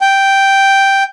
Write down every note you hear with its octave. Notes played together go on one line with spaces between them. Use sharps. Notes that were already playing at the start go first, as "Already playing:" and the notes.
G5